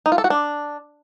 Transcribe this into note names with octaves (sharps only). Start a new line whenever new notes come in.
D#4
F4
A4
F#4
D4